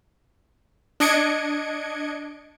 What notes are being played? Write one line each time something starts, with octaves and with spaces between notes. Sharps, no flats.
D4 D#5 G#6 C#7 D7